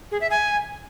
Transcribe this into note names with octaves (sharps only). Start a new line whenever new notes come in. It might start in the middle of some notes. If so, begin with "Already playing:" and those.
G#4
E5
G#5